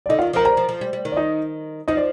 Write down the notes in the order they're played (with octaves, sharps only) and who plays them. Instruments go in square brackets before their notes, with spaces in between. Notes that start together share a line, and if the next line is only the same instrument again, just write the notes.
[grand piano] D5
[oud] D3 [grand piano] D#4 D#5
[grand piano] F4 F5
[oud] D#3
[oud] F3 [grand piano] A#4 A#5
[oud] G3 [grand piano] A#4 A#5
[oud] F3
F3
G3
G3
D#3
[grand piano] D5
D#4 D#5
[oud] F3 [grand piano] D#4 D#5
[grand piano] D5